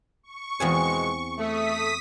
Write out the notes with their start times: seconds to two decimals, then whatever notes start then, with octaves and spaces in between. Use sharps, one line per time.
0.23 C#6
0.60 E2 B2 F3 G#3 C4 G#5
1.38 A3 D#6 B6